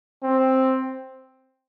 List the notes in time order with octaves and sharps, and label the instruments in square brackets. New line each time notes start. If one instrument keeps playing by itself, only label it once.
[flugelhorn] C4